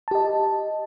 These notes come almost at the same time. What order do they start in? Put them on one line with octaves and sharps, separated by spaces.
A5 G4 D#5